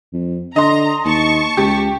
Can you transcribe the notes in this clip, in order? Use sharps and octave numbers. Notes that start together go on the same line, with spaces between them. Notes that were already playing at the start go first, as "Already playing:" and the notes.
F2
D3 D#5 A#5 C6
D#2 A5 C#6
C#2 G4